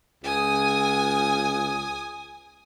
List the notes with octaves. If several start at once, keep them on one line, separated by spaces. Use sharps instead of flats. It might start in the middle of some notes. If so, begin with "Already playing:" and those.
C#2 G#5 D#6